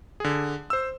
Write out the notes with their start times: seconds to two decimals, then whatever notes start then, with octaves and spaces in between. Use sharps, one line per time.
0.20 D3 G#4
0.70 C5 E6